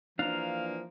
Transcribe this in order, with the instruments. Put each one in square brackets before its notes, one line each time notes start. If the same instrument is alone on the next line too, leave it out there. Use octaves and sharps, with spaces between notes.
[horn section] E3 F3 A#3 [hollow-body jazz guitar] D4 [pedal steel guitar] F5 A#5